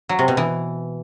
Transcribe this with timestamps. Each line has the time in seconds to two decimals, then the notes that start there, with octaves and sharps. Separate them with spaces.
0.09 F#3
0.19 C3
0.28 B2
0.37 E3